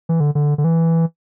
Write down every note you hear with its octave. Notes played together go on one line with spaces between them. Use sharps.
E3
D3
D3
D3
E3